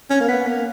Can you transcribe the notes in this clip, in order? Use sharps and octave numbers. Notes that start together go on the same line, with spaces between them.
C#4
A#3
B3
A#3